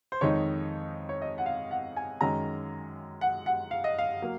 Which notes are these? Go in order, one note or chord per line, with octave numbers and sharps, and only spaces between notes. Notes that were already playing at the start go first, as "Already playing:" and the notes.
C5
F2 D#3 G#3 D#4 C#5
C#5
D#5
F#5
F5
F#5
G#5
F#2 D#3 G#3 C#4 A#5
F#5
F#5
F5
D#5
F5
F#3 A#3